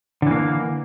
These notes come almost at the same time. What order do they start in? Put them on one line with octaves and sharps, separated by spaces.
D3 E3 A#3